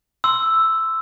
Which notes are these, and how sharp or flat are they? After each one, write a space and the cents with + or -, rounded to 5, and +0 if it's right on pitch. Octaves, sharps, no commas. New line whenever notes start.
C6 -5 E6 +0